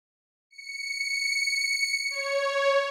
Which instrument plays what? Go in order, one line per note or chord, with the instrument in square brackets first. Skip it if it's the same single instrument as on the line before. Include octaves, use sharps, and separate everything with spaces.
[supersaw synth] C#7
C#5